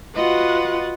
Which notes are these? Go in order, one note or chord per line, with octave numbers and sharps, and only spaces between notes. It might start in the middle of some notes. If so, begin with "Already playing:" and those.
F4 F#4 B4 D#5 F#5